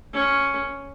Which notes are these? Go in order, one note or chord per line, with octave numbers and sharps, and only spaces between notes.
C#4